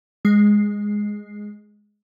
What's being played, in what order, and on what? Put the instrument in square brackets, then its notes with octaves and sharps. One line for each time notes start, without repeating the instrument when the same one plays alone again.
[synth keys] G#3 C7